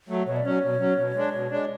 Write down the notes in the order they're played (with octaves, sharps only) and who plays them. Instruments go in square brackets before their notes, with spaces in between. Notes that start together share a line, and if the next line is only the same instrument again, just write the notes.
[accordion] F#3 A3
[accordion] B2 [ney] C#5
[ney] D5
[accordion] F#3 C#4 [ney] C#5
[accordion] B2
F#3 C#4
B2
G#3 D4
B2
G#3 D4